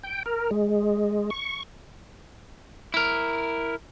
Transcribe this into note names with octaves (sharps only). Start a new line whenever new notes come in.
G5
A#4
G#3
C#6
E4 A#4